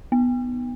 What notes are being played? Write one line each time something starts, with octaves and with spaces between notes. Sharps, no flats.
B3